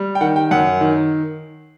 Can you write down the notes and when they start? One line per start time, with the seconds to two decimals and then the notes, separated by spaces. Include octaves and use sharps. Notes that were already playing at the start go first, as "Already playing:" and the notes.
Already playing: G3
0.15 G5
0.21 D#3 F#5
0.36 G5
0.51 F#2 F#5
0.81 D#3